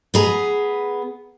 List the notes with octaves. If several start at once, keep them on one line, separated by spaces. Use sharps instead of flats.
B3 G#4 A#5